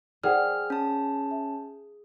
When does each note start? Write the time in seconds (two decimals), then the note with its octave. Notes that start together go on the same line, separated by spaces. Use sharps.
0.24 G#4 A#4 C5 D5 F#5 G5 F6
0.70 C#4 A5
1.31 E5